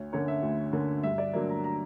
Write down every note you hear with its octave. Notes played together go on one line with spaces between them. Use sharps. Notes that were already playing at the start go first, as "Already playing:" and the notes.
Already playing: D2 C#5
D3 A#3 C#4 C#5
E5
D2
D3 A#3 C#4
G2 E5
D5
D3 F#3 A#3 D5
A#5
A#5